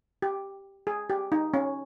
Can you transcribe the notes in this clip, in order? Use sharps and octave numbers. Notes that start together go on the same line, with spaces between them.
G4
G#4
G4
D#4
C#4